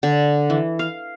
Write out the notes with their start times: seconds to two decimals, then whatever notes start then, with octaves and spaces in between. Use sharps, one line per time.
0.03 D3
0.50 E3
0.79 F5